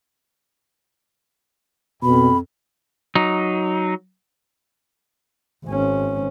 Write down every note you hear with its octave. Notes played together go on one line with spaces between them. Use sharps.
F2 B2 B5
F#3 D#4
G#1 C#4